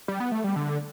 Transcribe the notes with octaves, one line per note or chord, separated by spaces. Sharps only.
G3
B3
A3
G3
D3